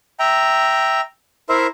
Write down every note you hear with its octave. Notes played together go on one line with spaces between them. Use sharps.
E5 G5 A#5
E4 A#4 C5 E5